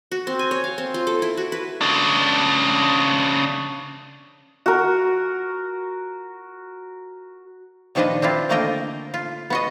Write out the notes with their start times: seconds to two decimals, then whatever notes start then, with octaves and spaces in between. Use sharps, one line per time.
0.12 F#4
0.27 C4
0.39 G#5
0.51 C#5
0.64 F5
0.78 C4
0.94 F4
1.07 A4
1.22 E4
1.37 F#4
1.52 B4
1.81 C#3 D4
4.66 F#4 A#4
7.95 A#2 D#3 F3 D4 B4 D#5
8.22 C4 D4 E4 F4
8.49 D3 A3 A#3 A#4 D#5 G5
9.14 F4
9.50 B3 F#4 D#5